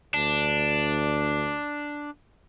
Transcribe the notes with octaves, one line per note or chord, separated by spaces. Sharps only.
D2 D4